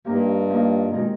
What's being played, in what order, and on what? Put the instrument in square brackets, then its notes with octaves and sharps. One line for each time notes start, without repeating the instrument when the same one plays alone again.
[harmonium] G2 [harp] F3 A#3 D#4 G4
[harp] F3 A#3 D#4 G4
[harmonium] B2 [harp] D#3 G#3 C4 D#4